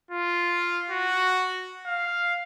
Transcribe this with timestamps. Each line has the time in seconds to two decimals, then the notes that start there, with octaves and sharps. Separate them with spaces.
0.11 F4
0.90 F#4
1.86 F5